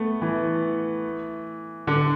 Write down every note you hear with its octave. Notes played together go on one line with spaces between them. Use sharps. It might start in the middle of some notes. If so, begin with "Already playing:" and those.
Already playing: A3 B3
E3
D3